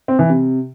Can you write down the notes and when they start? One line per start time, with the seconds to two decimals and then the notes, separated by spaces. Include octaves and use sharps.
0.08 C4
0.19 E3
0.29 C3